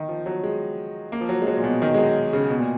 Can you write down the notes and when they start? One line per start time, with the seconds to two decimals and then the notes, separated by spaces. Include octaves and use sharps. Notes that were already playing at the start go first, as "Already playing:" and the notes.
Already playing: D#3
0.09 F3
0.26 F#3
0.43 G#3
1.12 A#3
1.21 F3
1.29 F#3
1.41 G#3
1.47 F#3
1.57 A#2
1.64 B2
1.82 D#3
1.94 G#3
1.98 F#3
2.33 C#3
2.50 B2
2.58 A#2